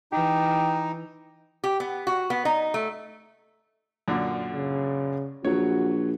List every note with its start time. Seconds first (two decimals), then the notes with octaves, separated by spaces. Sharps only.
0.12 E3 D#4 G4
1.64 G4
1.80 B3
2.07 F#4
2.30 B3
2.45 D#4
2.74 A3
4.08 F#2 A#2 D3
4.53 C#3
5.45 A#1 F#3 F#4 C#5